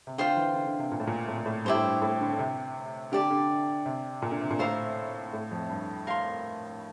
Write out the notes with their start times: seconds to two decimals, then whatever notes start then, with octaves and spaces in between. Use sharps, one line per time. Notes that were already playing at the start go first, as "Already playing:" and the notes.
0.07 C3
0.18 D3 F4 C5 G5
0.37 E3
0.55 D3
0.67 D3
0.79 C3
0.92 A#2
1.00 A2
1.07 A#2
1.28 A2
1.37 A#2
1.46 A2
1.65 G2 E4 G4 C5
1.75 A2
1.83 G2
2.02 A2
2.21 D3
2.32 D3
2.39 C3
3.12 D3 G4 D5 A5
3.31 D3
3.86 C3
4.22 A#2
4.31 D3
4.41 C3
4.50 A#2
4.59 A2 F4 C5 E5 A#5
5.33 A2
5.51 F2
5.70 G2
6.07 A#4 F5 C6